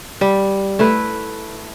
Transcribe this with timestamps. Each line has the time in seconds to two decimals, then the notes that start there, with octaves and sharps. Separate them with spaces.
0.21 G3
0.79 A3 E4 B4